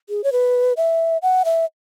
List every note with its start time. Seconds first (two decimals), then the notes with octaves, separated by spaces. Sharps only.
0.09 G#4
0.24 C#5
0.32 B4
0.77 E5
1.22 F#5
1.45 E5